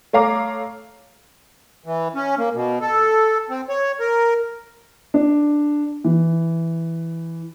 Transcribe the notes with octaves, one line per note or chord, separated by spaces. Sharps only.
A3 C#5 F5 A#5 D6
E3
C#4
A#3
B2
A4
C4
C#5
A#4
D4
E3